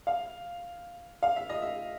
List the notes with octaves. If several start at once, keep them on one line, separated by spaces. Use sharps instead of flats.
F5
F5
E5
D#5
E5